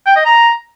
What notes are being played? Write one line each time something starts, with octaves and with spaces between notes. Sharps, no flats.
G5
D#5
A#5